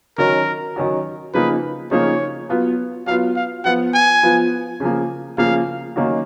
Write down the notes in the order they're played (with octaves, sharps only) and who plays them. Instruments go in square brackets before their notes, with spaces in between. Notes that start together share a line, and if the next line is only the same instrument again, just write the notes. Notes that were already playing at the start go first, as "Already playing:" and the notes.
[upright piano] D#3 F#3 C#4 F#4 [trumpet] A#4
[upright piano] D#3 F#3 C#4 F#4
[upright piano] C#3 F3 A#3 D#4 [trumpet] B4
[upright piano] C#3 F3 A#3 D#4 [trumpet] C#5
[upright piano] F#3 B3 F4
[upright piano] F#3 B3 F4 [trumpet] F5
[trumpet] F5
[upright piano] F3 B3 F4 [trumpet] F#5
[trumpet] G#5
[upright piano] F3 B3 F4
C#3 F3 A#3
[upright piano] C#3 F3 A#3 [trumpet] F5
[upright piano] D#3 F#3 A#3 C#4 F#4